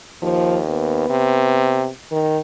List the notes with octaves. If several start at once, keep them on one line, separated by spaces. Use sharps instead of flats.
D#2 F3
B3
C3
D#3